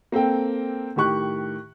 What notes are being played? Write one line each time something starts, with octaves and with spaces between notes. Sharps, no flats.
A#3 C4 A4 G5
A2 D#3 G4 C#6 F#6